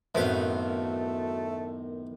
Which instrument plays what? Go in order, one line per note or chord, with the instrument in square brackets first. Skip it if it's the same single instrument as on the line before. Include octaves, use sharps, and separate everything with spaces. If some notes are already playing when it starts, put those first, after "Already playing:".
[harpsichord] F#2 C4 F5 [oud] A2 D#3 B3 [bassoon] A3 [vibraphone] F#4